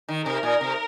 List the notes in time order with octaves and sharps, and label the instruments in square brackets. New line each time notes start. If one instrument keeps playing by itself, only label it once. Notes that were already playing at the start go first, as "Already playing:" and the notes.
[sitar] D#3
[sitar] C3 [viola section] A#4
[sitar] A#2
C3